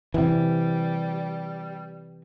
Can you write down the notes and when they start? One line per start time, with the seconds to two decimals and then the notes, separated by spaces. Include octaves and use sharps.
0.14 C3 E3 G3